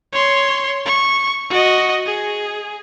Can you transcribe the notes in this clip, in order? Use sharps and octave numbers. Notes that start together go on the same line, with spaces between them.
C#5 C6
C#6
F#4 D#5
G#4